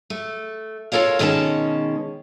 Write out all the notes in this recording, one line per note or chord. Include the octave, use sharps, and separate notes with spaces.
A3
F4 A4 A#4 C#5 F5
B2 D#3 G#3 C#4 A5